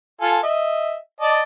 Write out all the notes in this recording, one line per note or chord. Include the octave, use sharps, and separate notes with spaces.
F4 A4 G#5
D#5 E5
D5 D#5 A5